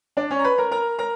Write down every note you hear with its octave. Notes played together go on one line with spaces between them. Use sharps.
D4 D5
C#4 C#5
A#5
B4 B5
A#4 A#5
A#4 A#5
A#4 A#5